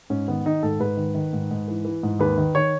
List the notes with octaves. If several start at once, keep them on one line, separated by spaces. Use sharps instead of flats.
G#2 C#4
D#3 B3
D#3 D#4
G#2 A4
G#2 B4
D#3
D#3
G#2
G#2
E3
E3
G#2
D#2 B4
D#3
D#3 C#5